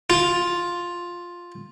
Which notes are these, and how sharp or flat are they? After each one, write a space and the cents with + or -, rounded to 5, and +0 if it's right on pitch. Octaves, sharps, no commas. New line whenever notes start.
F4 +5